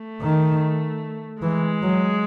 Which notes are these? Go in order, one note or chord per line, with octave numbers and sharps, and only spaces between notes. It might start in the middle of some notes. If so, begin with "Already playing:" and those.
Already playing: A3
D#3
E3 G#3
F#3